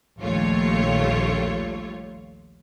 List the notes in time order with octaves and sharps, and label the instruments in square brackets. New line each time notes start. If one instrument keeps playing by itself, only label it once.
[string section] A#1 D#2 G3 A3 F4 C#5